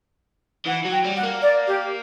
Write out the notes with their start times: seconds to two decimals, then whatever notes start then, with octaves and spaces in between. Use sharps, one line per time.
0.66 E3 F#5
0.85 F#3
0.91 G5
1.04 G3
1.16 F#5
1.23 A#3
1.42 D5
1.67 G4